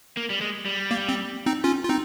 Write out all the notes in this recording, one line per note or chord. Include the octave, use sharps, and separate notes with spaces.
A#3
G3
G#3
G3
A#3
C4
C4 D#4
C#4 F4
F4
C4 D#4